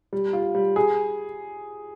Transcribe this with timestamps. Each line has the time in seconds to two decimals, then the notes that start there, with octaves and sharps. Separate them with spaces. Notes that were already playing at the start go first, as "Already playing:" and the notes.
0.13 G3
0.33 F4
0.55 G3
0.76 G#4